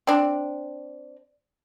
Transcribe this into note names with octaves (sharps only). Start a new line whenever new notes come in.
C4 D4